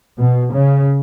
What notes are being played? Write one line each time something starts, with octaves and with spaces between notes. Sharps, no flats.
B2
C#3